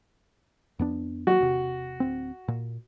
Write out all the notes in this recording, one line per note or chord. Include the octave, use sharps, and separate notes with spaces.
F2 B3 D4
F#3 F#4
E1 C3
D1 C4
A#2